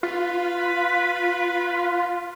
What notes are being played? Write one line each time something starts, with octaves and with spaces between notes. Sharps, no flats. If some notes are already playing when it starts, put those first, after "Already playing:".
F4 B4